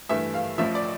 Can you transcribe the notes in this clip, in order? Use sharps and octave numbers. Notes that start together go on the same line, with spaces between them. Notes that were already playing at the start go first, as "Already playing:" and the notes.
G2 E3 A3 E5
F5
A1 A2 F3 E5
D5